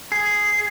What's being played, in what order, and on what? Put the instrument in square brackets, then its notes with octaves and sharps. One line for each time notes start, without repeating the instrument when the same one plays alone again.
[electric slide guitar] G#4